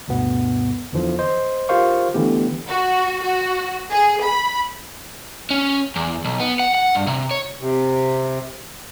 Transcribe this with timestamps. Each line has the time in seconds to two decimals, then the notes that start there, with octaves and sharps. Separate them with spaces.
0.08 D2 G2 B2 B3
0.93 E2 D3 E3 F3
1.19 C5 D#5
1.69 F4 G4 A#4 C5 F5 C#6
2.14 D3 E3 A3 B3 G4
2.67 F#4
3.23 F#4
3.91 G#4
4.24 B5
5.50 C#4
5.96 E2
6.25 B1
6.40 B3
6.60 F#5
6.75 F#5
6.95 G2
7.07 C3
7.31 C#5
7.61 C3